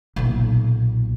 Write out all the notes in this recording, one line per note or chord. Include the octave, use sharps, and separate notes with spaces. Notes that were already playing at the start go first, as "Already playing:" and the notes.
B1 A#2